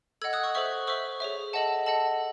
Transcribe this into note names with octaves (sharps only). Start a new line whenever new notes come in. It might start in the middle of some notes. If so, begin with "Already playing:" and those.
A4 D#5 F#5 E6 G#6
D#6 F#6
C#6 E6
A4 C5 E5 C#6 E6
C5 E5 C#6 E6
G#4 C#5 E5
A4 D#5 F#5 A5
A4 D#5 F#5 A5